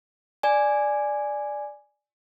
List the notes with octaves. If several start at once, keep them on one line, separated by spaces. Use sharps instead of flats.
D5 G#5